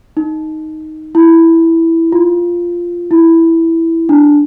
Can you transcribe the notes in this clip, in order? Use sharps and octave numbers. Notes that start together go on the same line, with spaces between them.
D#4
E4
F4
E4
D4